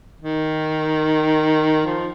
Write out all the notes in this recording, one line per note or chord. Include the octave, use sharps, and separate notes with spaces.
D#3
F3